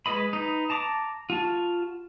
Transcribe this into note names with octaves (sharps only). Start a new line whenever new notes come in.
G#3 A4 B4 D#5 B5
D#4 B4
A5 A#5 D6
F4 F#4 A5